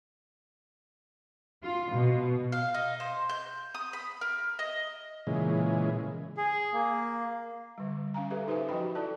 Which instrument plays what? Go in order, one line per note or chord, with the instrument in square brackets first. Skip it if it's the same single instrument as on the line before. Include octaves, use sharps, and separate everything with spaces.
[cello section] F4
B2
[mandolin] F5
D#4
C5
G6
D#6
B5
A#4
D#5
[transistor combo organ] A#2 C#3 E3 G#3
[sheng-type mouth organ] G#4
A#3
[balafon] D3 G3
C#4 F5 G#5 A#5
G4 A4 B4 E5
D#4 G4 B4 C5 E5 G#5
F3 F#4 D#5 G5 B5
E4 A4 D5 A5